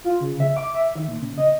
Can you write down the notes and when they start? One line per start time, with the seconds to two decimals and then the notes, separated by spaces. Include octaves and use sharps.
0.04 F4
0.21 C#3
0.40 E5
0.57 D6
0.75 E5
0.96 D#3
1.08 A#2
1.21 C#3
1.38 D#5